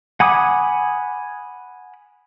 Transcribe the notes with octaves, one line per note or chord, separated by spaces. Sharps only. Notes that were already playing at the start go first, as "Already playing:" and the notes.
F#5 G#5 B5 D6 D#6